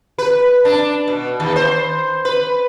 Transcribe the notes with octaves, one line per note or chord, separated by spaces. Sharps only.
B4
D4
B2
D#2
C5
B4